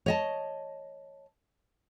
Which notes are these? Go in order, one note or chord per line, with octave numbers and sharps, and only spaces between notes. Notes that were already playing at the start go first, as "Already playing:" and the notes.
C#5 D#5 A5